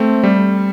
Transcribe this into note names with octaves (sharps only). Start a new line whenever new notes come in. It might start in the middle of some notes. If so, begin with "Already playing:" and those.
Already playing: A3 C4
G3